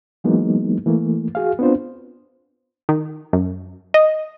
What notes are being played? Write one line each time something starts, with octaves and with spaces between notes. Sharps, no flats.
E3 F#3 G#3 A#3 B3 D#4
E3 A3 A#3
F#4 G#4 F5
B3 C4 D4 F4 C5
D#3
F#2
D#5